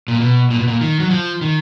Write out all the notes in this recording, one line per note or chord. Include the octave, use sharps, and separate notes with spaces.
A#2
B2
A#2
B2
A#2
D#3
F#3
F3
D#3